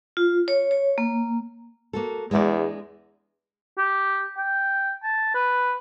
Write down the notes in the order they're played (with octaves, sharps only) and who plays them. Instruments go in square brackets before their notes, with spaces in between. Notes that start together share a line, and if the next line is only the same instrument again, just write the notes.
[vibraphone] F4
C#5
C#5
A#3
[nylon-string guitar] A#3 F#4 A4
[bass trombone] E2 [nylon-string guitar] G#3 D4 D5
[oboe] G4
G5
A5
B4